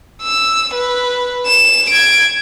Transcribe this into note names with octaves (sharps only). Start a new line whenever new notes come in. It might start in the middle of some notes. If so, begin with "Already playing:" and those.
E6
B4
E7
G#6 D7